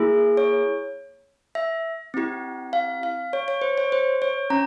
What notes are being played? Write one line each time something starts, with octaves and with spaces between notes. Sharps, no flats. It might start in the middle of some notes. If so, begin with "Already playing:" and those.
Already playing: A#3 E4 G#4
C#5
E5
C4 E4 G4
F5
F5
C#5
C#5
C5
C#5
C5
C#5
C#4 A#5